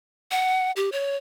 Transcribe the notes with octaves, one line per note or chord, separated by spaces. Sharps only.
F#5
G4
C#5